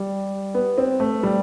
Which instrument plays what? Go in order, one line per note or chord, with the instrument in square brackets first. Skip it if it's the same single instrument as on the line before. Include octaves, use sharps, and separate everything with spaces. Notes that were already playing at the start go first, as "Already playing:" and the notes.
Already playing: [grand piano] G3
B3
C4
A3
G3